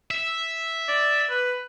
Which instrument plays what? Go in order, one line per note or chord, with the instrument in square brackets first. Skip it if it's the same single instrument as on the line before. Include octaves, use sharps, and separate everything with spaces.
[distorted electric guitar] E5
[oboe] D5
B4